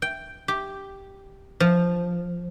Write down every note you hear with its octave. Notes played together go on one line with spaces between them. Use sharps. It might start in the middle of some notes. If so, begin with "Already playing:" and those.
G5
G4
F3